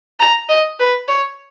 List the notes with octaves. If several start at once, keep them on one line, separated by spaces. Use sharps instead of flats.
A#5
D#5
B4
C#5